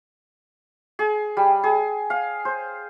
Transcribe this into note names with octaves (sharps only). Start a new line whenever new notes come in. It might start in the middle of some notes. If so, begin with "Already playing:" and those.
G#4
G3
G#4
F5
C5